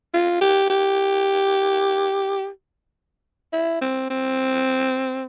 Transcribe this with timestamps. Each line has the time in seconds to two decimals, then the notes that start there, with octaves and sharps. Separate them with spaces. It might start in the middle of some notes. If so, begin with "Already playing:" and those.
0.14 F4
0.41 G4
0.70 G4
3.53 E4
3.81 C4
4.10 C4